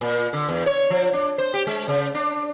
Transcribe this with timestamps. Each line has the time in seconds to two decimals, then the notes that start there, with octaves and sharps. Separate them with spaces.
0.01 A#2
0.33 D3
0.49 E2
0.66 C#5
0.90 F3
1.13 D4
1.38 C5
1.54 G4
1.67 G#3
1.88 C#3
2.15 D4